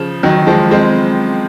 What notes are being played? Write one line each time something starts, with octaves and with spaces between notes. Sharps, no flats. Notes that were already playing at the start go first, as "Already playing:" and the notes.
Already playing: C#3 F3
D#3 F#3
F3 G#3
G#3 C4